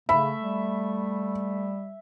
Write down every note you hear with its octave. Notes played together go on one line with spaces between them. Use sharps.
C#3 A3 E5 B5
G3